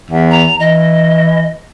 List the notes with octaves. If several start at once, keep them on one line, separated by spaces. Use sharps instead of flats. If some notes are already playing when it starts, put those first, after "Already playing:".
E2
A#5
E3 D#5